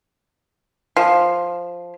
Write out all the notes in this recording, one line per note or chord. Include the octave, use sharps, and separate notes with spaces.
F3